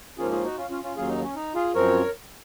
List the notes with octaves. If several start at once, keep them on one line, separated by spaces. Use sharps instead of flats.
G#2 F3 A#3 C#4 F4 G#4
F4 G#4
D#4 F#4
C#4 F4
C#4 F4
C#4 F4
D#2 C#3 F#3 F4 G#4
D#4
C#4
D#4
F4 G#4
F#2 F3 C4 A#4 C#5